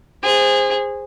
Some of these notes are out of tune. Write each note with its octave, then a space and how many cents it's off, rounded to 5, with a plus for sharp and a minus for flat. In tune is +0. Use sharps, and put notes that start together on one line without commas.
G#4 -20 C5 +0